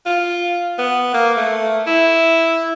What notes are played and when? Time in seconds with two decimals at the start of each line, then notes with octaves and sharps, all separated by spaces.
0.06 F4
0.78 B3
1.14 A#3
1.36 A3
1.86 E4